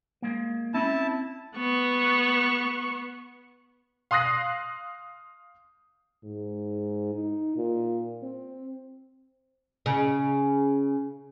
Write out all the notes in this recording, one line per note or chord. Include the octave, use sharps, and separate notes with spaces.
G#3 A#3
C4 C#4 E4 A5 B5
B3 C#6
F5 C6 D#6 F#6 A#6 C7
G#2
D#4
A#2
C4
C#3